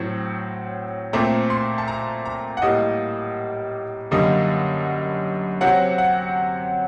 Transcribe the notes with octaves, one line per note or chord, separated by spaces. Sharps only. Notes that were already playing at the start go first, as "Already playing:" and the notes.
Already playing: A2 F#3 C4
A#2 A3 C4 A#5
C6
A5
A#5
A#5
F#5
A2 G3 A#3 D#5
F#2 D3 G3 A#3 D#5
C3 F#3 C4 F#5
F#5